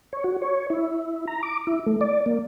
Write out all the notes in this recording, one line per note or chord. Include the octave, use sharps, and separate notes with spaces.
C#5
F#4
C#5
E4
A#5
D6
E4
A3
D5
A#3